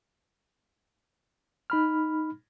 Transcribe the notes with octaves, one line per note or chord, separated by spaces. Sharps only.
D#4 B5 F6